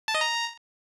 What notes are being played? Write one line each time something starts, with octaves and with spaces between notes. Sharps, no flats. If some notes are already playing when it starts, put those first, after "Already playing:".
A5
D#5
A#5